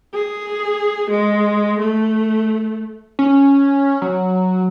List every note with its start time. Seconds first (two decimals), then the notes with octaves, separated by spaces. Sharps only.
0.14 G#4
1.11 G#3
1.80 A3
3.19 C#4
4.02 F#3